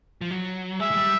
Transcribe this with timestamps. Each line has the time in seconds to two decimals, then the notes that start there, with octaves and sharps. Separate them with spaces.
0.21 F3
0.30 F#3
0.80 G#3 E5
0.91 G#3
0.97 G3